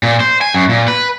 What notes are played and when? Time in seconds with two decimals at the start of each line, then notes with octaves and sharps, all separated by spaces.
0.03 A#2
0.20 C5
0.41 G#5
0.54 F#2
0.69 A#2
0.88 B4